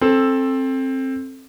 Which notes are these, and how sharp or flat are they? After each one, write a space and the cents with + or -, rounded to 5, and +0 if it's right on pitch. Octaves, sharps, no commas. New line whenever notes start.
C4 +20 A4 +0